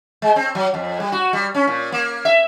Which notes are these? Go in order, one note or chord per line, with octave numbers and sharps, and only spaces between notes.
G#3
C4
F#3
F2
G3
F#4
G3
C#4
A#2
A#3
E5